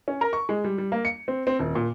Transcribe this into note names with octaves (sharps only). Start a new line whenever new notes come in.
C#4
A#4
C#6
G#3
G3
G3
A#3
C#7
C4
C4
D#1
A#2